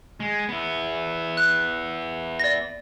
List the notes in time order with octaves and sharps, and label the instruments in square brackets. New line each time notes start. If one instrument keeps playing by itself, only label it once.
[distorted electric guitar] G#3
B3 E4
[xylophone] F#6
D5 A#6